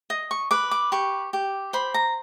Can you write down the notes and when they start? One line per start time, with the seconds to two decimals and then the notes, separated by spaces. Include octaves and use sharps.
0.10 D#5
0.31 C#6
0.51 B4 D6
0.71 D6
0.92 G4 C#6
1.33 G4
1.73 C5 B5
1.94 A#5